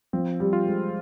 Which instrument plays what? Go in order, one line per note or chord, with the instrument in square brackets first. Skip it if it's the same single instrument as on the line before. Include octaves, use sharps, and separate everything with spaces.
[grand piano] F3 [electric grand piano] C4
[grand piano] G3
[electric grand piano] F4
[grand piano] G#3